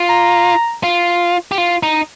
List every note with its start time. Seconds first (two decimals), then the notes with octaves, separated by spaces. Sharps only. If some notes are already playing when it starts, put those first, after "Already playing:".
Already playing: F4
0.09 A#5
0.83 F4
1.52 G4
1.58 F4
1.83 D#4